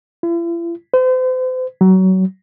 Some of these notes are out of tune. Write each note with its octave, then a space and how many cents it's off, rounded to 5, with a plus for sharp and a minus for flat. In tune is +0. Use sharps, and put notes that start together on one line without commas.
E4 +45
C5 -40
F#3 +25